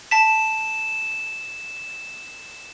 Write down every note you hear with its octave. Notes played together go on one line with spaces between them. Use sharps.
A5 B6 E7